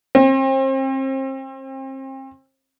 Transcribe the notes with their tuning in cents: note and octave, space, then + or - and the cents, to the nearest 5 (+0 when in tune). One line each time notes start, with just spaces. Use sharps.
C4 +40